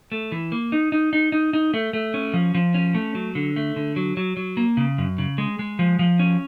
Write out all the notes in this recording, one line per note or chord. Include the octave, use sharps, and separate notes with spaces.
A3
E3
A#3
D#4
D#4
D#4
D#4
D#4
A3
A3
C#4
F3
F3
C#4
A3
F#3
D3
A3
D3
F#3
F#3
F#3
A#3
C#3
F#2
C#3
G#3
G#3
F3
F3
C#4